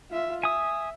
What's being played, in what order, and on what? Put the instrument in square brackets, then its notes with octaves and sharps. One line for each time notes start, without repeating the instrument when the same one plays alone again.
[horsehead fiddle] F4 E5
[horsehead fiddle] E5 [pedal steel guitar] G#5 D#6